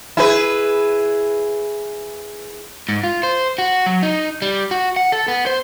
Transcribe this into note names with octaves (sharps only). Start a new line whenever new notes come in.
E4 G#4 B4
G#2
F4
C5
F#4
F#3
D#4
G3
F#4
F#5
A4
B3
C5